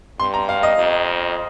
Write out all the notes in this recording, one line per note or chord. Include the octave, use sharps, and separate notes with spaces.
G2 C6
A#5
F5
D#5
F2